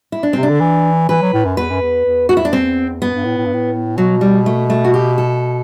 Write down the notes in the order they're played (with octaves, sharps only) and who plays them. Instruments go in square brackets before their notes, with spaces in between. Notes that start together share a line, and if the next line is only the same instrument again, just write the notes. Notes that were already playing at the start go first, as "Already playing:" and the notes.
[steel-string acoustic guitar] E4
D4
[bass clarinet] C3 [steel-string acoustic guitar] C4
[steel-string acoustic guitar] D4
[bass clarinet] D3
E3
[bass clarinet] E3 [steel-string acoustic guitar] B4
[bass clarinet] F#3
A2
F#2
[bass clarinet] E2 [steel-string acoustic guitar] B4
[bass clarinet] F#2
E2
E2
[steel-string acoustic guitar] F#4
E4
D4
[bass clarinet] E2 [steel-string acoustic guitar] C4
[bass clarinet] F#2 [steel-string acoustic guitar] B3
[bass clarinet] G2
A2
A2
G2
A2
[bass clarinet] B2 [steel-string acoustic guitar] F#3
[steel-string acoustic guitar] G3
A3
A3
F#4
G4
A4